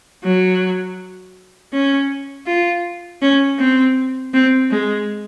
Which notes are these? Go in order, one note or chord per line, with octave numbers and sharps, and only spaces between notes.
F#3
C#4
F4
C#4
C4
C4
G#3